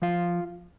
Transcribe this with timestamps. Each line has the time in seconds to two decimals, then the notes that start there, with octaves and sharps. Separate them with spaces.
0.02 F3 F4 F5